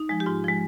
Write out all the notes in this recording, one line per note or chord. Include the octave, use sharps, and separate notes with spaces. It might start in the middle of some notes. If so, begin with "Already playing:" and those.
Already playing: D#4
F3 G#3
G4
G#2 F4
F3 G#3